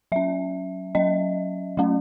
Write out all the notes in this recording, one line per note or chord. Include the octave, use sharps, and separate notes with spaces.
F#3 C#4 E5
F#3 C#4 D#5
F#3 A3 C#4